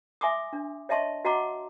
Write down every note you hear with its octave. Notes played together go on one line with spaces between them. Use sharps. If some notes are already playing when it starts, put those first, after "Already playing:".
E5 G#5 C6 D6 D#6
D4
C#5 D#5 E5 A5 C6 C#6
F#4 D#5 F#5 A#5 C6 D6